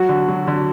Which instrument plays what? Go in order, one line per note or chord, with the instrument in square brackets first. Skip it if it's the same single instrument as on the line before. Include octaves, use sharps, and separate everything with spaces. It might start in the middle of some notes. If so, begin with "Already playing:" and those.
Already playing: [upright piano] F#3 [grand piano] F#4
[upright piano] D3
F#3
D3